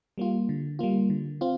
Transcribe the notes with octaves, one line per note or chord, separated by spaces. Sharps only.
G3 A#3 F4
D3
G3 A#3 F4
D3
C4 F4